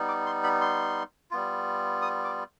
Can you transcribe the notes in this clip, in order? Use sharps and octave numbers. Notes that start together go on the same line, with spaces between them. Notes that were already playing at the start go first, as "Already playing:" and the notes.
Already playing: G3 B3 D#4
D6
C6
B5
C6
G3 B3 F4
D#6
D6